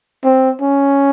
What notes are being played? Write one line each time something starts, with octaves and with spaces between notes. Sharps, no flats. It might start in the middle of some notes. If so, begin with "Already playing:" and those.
C4
C#4